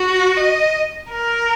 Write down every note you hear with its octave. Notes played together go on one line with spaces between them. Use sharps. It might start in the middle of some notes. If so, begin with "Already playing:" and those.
Already playing: F#4
D#5
A#4